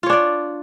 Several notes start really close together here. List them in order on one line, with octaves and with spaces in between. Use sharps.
F4 C#5 D4 D5